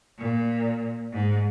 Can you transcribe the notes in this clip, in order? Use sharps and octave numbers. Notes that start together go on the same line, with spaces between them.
A#2
G#2